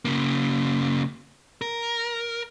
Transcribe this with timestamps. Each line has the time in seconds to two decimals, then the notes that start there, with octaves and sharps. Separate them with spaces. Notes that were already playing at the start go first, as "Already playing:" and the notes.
0.05 C#3 A#3
1.62 A#4